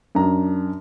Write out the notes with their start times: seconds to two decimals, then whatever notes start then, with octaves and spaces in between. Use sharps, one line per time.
0.15 F#2 D4 A#5